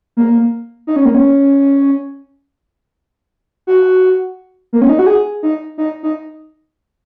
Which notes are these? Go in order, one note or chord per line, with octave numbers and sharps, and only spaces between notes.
A#3
D#4
C#4
A#3
C#4
F#4
A#3
C#4
D#4
F#4
G#4
D#4
D#4
D#4